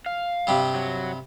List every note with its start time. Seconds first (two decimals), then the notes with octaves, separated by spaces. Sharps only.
0.06 F5
0.47 G2 C3 G3
0.74 F#3